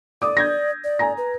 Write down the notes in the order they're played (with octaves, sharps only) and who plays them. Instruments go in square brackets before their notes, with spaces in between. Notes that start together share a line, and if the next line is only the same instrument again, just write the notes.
[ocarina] D5 [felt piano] D6 D#6
[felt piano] G6 G#6 A#6
[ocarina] D5
[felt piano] G#5 A#5 A#6
[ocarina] B4